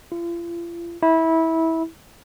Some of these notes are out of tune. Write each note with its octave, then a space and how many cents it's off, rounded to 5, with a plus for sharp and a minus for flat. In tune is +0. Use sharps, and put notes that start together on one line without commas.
F4 -40
E4 -20